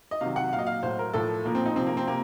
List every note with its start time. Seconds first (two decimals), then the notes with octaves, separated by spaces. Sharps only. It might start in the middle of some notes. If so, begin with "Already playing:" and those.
0.11 D#5
0.21 C3 D#3 F#3 F5
0.36 F#5
0.52 A#2 F5
0.55 F#3 D#5
0.67 F5
0.83 A2 F#3 C5
0.99 A#4
1.14 A2 F3 A4
1.45 A#2 F3 A#3
1.55 C4
1.66 D#4
1.76 C3 F3 C4
1.87 A#3
1.97 C4
2.08 C3 A#3